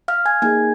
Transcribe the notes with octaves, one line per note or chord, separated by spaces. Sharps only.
F5 F6
G#5 G#6
A#3 D#4 G#4 G#5 G#6